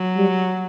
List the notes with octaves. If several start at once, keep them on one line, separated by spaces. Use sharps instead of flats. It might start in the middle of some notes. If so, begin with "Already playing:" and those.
Already playing: F#3
G3